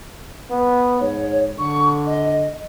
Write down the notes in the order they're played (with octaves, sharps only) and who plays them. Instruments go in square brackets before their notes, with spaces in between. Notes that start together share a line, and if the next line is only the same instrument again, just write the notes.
[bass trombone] B3
[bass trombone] G#2 [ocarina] C#5
[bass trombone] D3 [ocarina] C#6
[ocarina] D#5